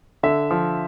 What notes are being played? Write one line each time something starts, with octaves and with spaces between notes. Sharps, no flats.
D3 E5
F3